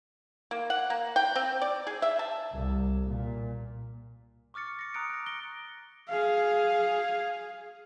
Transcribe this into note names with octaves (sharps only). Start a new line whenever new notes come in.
A#3
F#5
A#3
G5
C4
D5
G#4
E5
A5
C2
A#2
C#6 D6 F6 A6 C#7
A#6 C#7
A#5 D#6 F#6 C#7 D7
F#6 A#6
A#6 D7 G7
G#4 F5